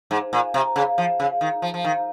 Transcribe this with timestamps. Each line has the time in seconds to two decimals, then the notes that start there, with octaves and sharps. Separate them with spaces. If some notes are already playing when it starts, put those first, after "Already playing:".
0.11 G#2
0.33 A#2
0.54 C3
0.76 C#3
0.98 F3
1.20 C#3
1.41 D#3
1.62 F3
1.74 F3
1.84 D#3